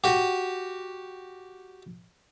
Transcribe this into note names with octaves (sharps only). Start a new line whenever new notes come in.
F#4 G4